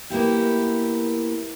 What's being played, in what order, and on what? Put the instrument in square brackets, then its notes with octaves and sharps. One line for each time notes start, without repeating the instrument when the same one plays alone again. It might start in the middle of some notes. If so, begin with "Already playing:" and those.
[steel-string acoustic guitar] A#3 B3 E4 G4